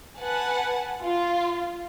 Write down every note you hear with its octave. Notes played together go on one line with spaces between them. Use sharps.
B4 F#5 G#5 A5
F4